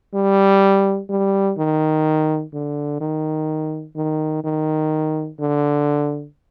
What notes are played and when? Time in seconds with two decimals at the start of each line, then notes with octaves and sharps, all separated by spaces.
0.14 G3
1.09 G3
1.57 D#3
2.53 D3
3.00 D#3
3.96 D#3
4.44 D#3
5.39 D3